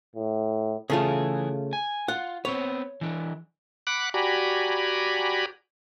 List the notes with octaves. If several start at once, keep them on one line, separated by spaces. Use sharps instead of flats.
A2
C#3 E3 A3 F4 G#4
G#5
F4 F#5
B3 C4 C#5
E3 D4
F#5 B5 D6 F#6
F#4 G4 D5 G#5 A#5 B5